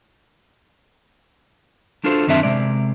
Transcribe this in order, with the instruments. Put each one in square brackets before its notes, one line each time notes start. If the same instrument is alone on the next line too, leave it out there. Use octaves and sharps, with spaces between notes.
[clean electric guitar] D4 F4 F#4 A4 C5
F#2 D#3 C4 D4 E5 A5
C3 G#3 D5